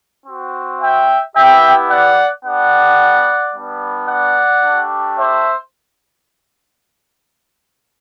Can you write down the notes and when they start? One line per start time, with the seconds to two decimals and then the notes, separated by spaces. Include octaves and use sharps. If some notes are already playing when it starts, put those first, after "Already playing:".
0.26 C4 F#4
0.81 E5 G5
1.35 B3 E4 G4 E5 G5
1.89 D5 F#5
2.44 B3 D4 G4 D5 F#5
3.54 G3 B3 D4
4.07 D5 F#5
4.62 A3 D4 G4
5.17 C5 E5